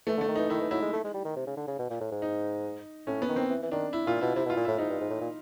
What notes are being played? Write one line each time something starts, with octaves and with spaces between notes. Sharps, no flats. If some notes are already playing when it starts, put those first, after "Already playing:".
E3 A3
D3
A3
D#3
E3 D#4
D#3 E4
E3
F#3 E4
G#3
A3
G#3
G3
D#3
C3
C#3
D3
C#3
B2
A#2
A2
G#2
D#4
A2 C#4
B3
D#3
C4
E3
E3
D#3 D4
E4
A#2 F4
B2 E4
C3 E4
B2
F4
A#2
A2 E4
G#2 D#4
G2
G#2
A2
A#2